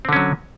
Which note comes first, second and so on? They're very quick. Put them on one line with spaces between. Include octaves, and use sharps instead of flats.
C4 D3 C#4 F#3